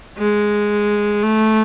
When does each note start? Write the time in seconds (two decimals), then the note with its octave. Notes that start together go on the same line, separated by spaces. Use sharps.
0.18 G#3
1.23 A3